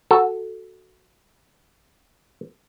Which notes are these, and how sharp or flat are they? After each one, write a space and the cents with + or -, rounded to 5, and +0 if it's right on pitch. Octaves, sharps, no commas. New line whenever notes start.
F#4 +0 A4 +0